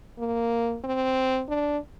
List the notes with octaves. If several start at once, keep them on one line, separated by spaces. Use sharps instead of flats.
A#3
C4
D4